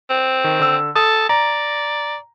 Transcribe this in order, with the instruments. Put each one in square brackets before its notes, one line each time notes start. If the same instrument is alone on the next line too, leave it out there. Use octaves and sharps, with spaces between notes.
[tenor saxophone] C4
[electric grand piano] D#3
D3 E6
[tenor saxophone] A4 [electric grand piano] D#6
[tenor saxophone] D5 [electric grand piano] A#5